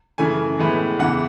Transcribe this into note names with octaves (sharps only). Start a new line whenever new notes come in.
F#2 C#3 E3 A3 G#5
A2 E3 G#3 B3
E2 C#3 E3 F#5